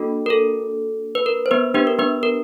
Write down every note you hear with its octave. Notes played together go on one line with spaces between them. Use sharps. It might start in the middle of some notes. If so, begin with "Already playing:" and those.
Already playing: A#3 D4 F#4 A4
A#4
A4
B4
A#4
C5
B3 B4
B3 D4 G4 B4
A#4
B3 B4
A#4